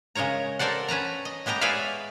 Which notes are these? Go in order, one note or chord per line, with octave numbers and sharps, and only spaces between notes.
C#3 G#3 A#4 C#5 A#5
A4 A#4 C5 D5 F#5
C#4 B4 A5 A#5
D#5
G#3 B3 G4 D#5 A#5
G#4 B4 C#5 D5 E5 F5